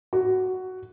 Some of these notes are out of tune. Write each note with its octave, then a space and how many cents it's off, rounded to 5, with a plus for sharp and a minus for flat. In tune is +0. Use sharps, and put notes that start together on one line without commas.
F#4 +5